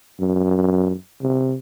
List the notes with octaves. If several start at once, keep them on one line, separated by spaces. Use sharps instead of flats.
F#2
C3